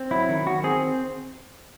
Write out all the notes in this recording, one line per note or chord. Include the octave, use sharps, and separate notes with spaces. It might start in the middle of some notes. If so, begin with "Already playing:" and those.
Already playing: C4
F#3 E4
D#3
D#3 F#4
C4 G#4